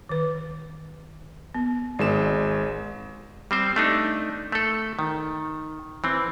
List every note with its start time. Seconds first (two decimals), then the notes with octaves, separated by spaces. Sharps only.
0.09 D#3 B4
1.54 B3
1.99 G#1 G#3 D5 E7
3.51 G3 C4 C5
3.76 A3 D4 D#4
4.52 A3 A4
4.99 D#3
6.04 E3 C4